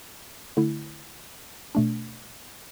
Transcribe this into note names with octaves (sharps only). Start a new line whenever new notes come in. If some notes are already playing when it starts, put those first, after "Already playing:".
D3 A3 E4
B2 A3 D4